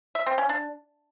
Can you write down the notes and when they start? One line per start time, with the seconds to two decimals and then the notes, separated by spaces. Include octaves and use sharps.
0.15 E5
0.26 C4
0.38 C#4
0.49 D4